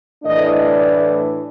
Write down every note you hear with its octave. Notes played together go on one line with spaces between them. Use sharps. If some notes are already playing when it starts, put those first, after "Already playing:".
A2 E3 A3 D4 D#5
D5